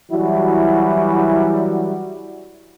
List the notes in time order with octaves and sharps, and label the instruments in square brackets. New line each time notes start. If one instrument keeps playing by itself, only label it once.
[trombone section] E3 F#3 G3 E4 F#4